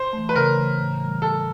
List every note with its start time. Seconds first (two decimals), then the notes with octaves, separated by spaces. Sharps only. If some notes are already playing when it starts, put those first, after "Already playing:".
Already playing: C5
0.13 E3 A3
0.29 B4
0.35 C#3 A#4
0.57 E3 A3
0.79 A2
1.00 E3 G3
1.22 A2 A4